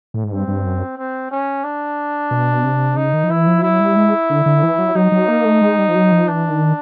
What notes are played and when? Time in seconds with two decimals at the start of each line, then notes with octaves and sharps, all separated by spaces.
0.14 A2
0.24 G#2
0.32 G2 C4
0.48 G2
0.66 F#2
0.98 C4
1.31 C#4
1.64 D4
2.31 B2
2.64 C3
2.96 C#3 D#4
3.13 D#3
3.23 F3
3.30 E3 E4
3.47 F3
3.63 F#3 E4
3.80 G3
3.97 G#3
4.30 D3
4.46 D3
4.63 E3
4.79 F#3
4.95 F#3 D#4
5.12 F#3
5.28 A#3
5.45 A3
5.61 G#3
5.79 G3
5.88 F3
5.95 F#3
6.12 F3
6.28 E3 D4
6.50 D#3